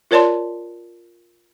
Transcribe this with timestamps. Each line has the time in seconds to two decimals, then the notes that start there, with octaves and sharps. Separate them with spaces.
0.11 F4 A#4 C#5 D5 A5 C6